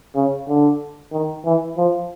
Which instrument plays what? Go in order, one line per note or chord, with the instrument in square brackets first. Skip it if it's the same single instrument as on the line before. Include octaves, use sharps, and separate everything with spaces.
[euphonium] C#3
D3
D#3
E3
F3